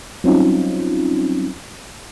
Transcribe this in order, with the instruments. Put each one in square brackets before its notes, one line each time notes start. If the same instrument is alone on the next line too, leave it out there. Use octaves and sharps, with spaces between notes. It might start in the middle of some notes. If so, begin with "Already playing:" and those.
[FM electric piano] F#3 G3 C4 C#4 D#4 F4